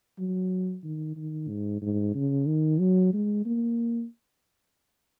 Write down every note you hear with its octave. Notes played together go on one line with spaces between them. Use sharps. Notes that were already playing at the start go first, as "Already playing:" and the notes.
F#3
D#3
D#3
G#2
G#2
C#3
D#3
F#3
G#3
A#3